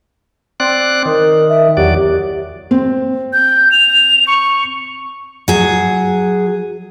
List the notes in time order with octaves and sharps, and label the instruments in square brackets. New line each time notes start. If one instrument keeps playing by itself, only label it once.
[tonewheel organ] C4 D5 F#6
[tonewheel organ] D#3 [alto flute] A#4
[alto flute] E5
[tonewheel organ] E2 F#3 D5 [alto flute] G4
[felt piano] C4
[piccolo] G6
F7
C#6
[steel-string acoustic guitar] F#3 G#4